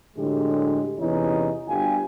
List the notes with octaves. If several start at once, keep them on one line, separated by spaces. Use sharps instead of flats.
A2 D3 F#3 G#3 E4 G4
E2 C3 C#4 D#4 E4
G1 D2 F4 G4 G#5